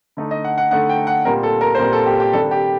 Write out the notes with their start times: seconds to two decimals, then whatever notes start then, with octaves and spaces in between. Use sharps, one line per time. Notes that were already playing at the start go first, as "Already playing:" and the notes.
0.17 D3 A3 D#4
0.31 D#5
0.44 F#5
0.58 F#5
0.71 D3 A3 D#4 F#5
0.89 G5
1.07 F#5
1.25 A#2 G3 C4 A#4
1.43 A4
1.61 A#4
1.75 C5
1.79 A#2 G3 C4 A#4
1.93 A4
2.06 G4
2.20 G4
2.33 C3 D#3 G3 D4 A4
2.51 G4